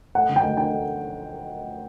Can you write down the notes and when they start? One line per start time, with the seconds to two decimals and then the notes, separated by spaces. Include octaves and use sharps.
0.15 A3 F#5
0.29 D3
0.36 G5
0.42 D2
0.57 D4 G5
0.71 A3